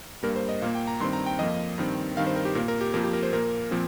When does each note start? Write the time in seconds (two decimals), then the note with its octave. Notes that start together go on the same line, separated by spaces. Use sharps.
0.23 G2 G3 A#3 A#4
0.36 C5
0.49 D#5
0.62 A#2 A#3 F5
0.75 G5
0.87 A#5
1.00 G2 D#3 C4 C6
1.13 A#5
1.26 G5
1.39 F2 F3 A#3 D#5
1.78 G2 D#3 C4
2.16 G2 D#3 C4 F5
2.27 C5
2.36 A#4
2.45 G4
2.55 A#2 A#3 A#4
2.68 A#4
2.81 G4
2.94 F2 F3 A#3 A#4
3.04 G4
3.13 A#4
3.23 C5
3.33 A#2 A#3 A#4
3.71 A#2 F3 C4